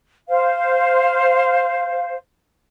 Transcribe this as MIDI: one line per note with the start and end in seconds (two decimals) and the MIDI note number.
0.29 2.16 72
0.29 2.16 77